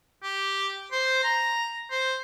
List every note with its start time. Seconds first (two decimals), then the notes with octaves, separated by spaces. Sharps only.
0.23 G4
0.92 C5
1.24 A#5
1.91 C5